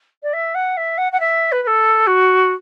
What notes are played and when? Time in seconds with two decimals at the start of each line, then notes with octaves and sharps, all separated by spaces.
0.23 D5
0.33 E5
0.55 F#5
0.77 E5
0.98 F#5
1.12 F#5
1.20 E5
1.52 B4
1.63 B4
1.67 A4
2.07 F#4